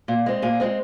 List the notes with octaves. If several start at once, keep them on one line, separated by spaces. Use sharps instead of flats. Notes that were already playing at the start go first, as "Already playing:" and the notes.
A#2
G#3 C4
A#2 G#4
G#3 C4